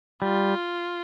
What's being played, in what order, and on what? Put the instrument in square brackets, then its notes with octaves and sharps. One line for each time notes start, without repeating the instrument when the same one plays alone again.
[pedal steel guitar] G3 [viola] F4